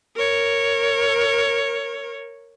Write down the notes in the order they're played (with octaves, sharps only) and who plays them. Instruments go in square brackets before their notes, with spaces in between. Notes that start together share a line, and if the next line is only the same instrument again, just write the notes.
[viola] A#4 C#5